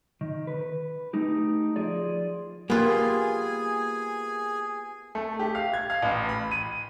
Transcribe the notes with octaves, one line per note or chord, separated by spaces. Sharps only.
D#3
B4
A3 D#4 G4
F3 F4 G#4 D5
A#3 B3 F4 G4 G#4 F5 G#5
A3
G4
F5
G#6
F5
A1
B5
D#7